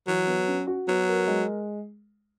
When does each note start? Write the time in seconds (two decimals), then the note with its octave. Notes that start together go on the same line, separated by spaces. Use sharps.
0.07 E3 F#3
0.27 B3
0.47 C#4
0.67 F#4
0.87 F#3 B3
1.08 A#4
1.27 G#3